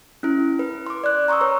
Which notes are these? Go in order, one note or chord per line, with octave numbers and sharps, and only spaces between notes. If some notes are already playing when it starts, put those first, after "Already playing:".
C#4 E4
B4
C6 D6
D5 F#6
A#5 C6 C#6 D#6 E6
B4 C#5 A#5